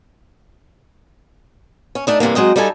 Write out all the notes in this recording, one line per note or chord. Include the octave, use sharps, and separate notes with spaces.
C#4
A3 D4 D#4
G2 C3 E3 A#3
F#3 G#3 C4 D#5
G3 D#4 F4 A4 G#5